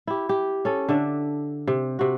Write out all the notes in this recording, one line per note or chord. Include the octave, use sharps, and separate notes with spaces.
E4 G4
G4
C#4 A4
D3 D4 E5
C3
C3 F#4